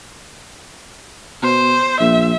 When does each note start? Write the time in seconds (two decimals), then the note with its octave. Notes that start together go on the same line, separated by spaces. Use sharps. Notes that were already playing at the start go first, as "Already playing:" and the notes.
1.43 B2 C5
2.00 A#1 E5